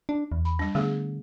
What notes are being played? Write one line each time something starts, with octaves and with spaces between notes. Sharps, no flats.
D4
E2
B5
G3 D4
D3 A3 B3 G#4